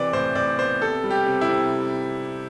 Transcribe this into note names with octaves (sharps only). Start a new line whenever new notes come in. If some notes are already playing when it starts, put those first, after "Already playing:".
Already playing: C3 E3 D5
A2 C5
A2 D5
B3 C5
C3 A4
G3
G4
C3
E4
C3